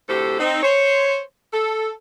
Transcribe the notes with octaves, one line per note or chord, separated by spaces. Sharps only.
D2 A2 C3 G4 A4 C5
C4 D#4
C5 C#5
A4